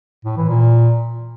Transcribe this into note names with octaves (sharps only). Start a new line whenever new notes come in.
A2
E3
A#2